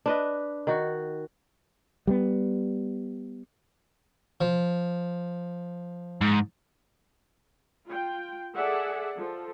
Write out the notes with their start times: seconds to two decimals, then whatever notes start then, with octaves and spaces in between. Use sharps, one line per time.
0.06 D4 B4 D#5
0.67 D#3 F#4
2.07 G3 G#3 B3
4.41 F3
6.21 G#2
7.86 F4 G5
8.54 G#4 A4 D5 E5 F#5
9.17 F3 A4